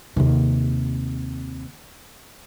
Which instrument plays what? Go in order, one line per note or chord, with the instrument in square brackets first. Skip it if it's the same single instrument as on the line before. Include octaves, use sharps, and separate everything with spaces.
[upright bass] D#2 C3